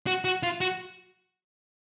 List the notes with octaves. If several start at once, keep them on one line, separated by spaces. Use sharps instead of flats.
F#4
F#4
F4
F#4